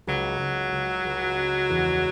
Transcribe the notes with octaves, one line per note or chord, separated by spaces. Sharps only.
C#2 F#3
C#2
C#2
C#2
C#4
E2